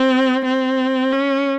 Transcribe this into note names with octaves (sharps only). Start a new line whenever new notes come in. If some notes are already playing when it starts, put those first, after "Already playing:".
Already playing: C4
C4
C#4